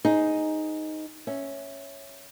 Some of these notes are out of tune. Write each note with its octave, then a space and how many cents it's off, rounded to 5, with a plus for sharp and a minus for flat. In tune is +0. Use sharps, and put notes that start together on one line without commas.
D#4 +0 G#4 +5 C5 +0
C#4 +0 E5 +0